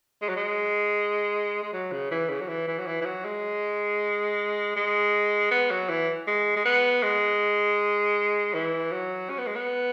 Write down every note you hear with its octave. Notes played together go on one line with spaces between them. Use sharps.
G#3
F#3
G#3
G#3
F#3
C#3
E3
C#3
F#3
E3
E3
F#3
E3
E3
F#3
G#3
G#3
B3
F#3
E3
G#3
G#3
B3
G#3
E3
F#3
C#4
B3
G#3
B3